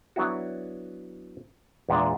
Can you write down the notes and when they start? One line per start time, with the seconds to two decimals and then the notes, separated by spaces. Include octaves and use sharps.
0.16 F#3 B3 D4 E4 F#4
1.89 E2 A#2 G#3 B3 D4